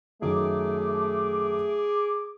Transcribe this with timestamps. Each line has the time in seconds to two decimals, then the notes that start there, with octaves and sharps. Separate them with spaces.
0.22 F#2 D#3 A3 G#4 D6